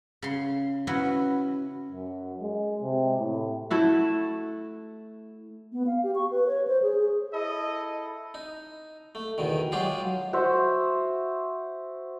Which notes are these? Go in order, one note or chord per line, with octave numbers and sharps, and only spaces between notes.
C#3 C6
C#4 E4 F#4 B4
F#2
G#3
C3
A2
A3 E4 F#4
B3
F5
G4
C#6
B4
C#5
C5
G#4
G#4
E4 A4 D#5
D#4
A3
E2 B2 D#3
F#3 G#3 F4 G4 G#4
F#4 C5 E5